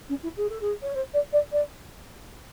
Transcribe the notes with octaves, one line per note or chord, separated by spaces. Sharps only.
C#4
E4
G#4
A4
G#4
C#5
C5
D5
D5
D5